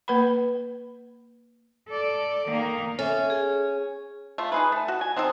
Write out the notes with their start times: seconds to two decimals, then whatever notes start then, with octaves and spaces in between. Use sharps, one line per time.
0.08 A#3 B4 F#5 B5
1.89 A4 D5
2.48 D#3 A#3
2.99 C#4 A4 E5
3.30 G#4
4.38 A3 F4
4.52 D#4 G#4 B4
4.72 A3 A5
4.88 F#4
5.01 G#5
5.16 F#3 C4 D#4 A4